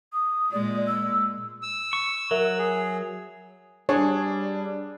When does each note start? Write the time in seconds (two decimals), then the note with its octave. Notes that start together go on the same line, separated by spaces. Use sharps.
0.12 D#6
0.52 A#2 G#3 D5
0.87 E6
1.63 E6
1.93 C#6
2.31 F#3 A#4 E5
2.59 G#4
3.89 G3 D4 G#4 C#5